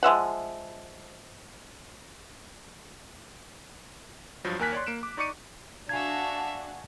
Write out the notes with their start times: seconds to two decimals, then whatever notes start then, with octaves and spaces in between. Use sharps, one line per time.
0.03 F3 G#3 E5 F#5
4.44 G2 F3 F#3
4.59 D#2 A#3 A#4 G#5 F#6 B6
4.72 C#5 D5 C6
4.87 A#3 D7 E7
5.03 D6
5.17 D#4 D5 C#6 D6 C#7 D#7
5.89 D4 F#4 E5 F5 G#5 A5 G#6